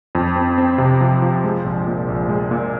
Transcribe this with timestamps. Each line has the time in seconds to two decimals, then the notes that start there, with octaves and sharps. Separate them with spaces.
0.15 F2
0.36 C4
0.58 C4
0.78 C3
1.01 F3
1.22 F3
1.44 G#3
1.64 A#1
1.87 A#2
2.08 A#1
2.29 G#3
2.51 A#2